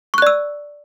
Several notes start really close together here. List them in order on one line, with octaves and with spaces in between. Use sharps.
C#6 F#6 D5 E6